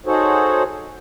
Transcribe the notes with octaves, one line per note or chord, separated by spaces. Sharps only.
D#4 F#4 G#4 A4 C5 C#5